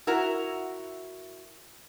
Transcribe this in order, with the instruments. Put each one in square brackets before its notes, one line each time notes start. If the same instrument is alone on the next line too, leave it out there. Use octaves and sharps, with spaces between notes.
[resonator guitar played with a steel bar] E4 F#4 A#4